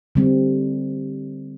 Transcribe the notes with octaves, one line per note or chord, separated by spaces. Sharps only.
D3 G3 C4